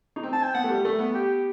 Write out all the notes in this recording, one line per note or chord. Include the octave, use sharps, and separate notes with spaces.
D#4
C4
A5
G5
B3 F#5
A3
G3
A3
B3
G4